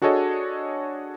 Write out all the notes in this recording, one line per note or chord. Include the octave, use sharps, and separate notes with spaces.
D4 F#4 G#4 A4 C#5 D#5